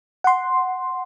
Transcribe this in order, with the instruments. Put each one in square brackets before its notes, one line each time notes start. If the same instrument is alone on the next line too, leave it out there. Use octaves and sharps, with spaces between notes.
[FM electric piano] F#5 C6